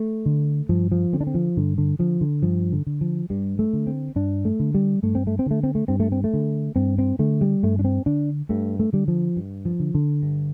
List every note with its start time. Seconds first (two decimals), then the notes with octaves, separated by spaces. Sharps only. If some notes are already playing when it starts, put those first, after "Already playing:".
Already playing: A3
0.26 D3
0.69 G2 F3
0.92 F3
1.13 D3 C4
1.21 D4
1.27 C4
1.35 F3
1.57 G2 D3
1.78 D3
1.99 D3 F3
2.21 D3
2.43 G2 F3
2.72 D3
2.87 D3
3.01 F3
3.30 G2 G3
3.59 A3
3.73 D3
3.87 C4
4.16 G2 D4
4.45 A3
4.60 D3
4.75 G3
5.03 G2 A3
5.15 C4
5.27 A3
5.39 C4
5.46 D3 A3
5.63 C4
5.75 A3
5.88 G2 C4
6.00 A3
6.12 C4
6.24 A3
6.34 D3
6.76 G2 C4
6.98 C4
7.19 D3 A3
7.41 G3
7.63 G2 A3
7.79 D4
7.85 C4
8.06 D3 D4
8.49 G2 A3
8.80 A3
8.93 D3 G3
9.08 F3
9.36 G2
9.65 F3
9.80 D3
9.95 D3
10.22 G2